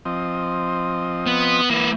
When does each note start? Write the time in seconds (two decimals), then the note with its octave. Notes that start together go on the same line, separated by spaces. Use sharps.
0.05 F3 C4 D#5
1.27 B3
1.70 E3 A#3 B4